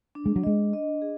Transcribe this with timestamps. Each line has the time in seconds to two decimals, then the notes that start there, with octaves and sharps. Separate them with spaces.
0.15 D4
0.26 G#3
0.36 F#3
0.44 G#3 D#5
0.73 D#5
1.02 G#4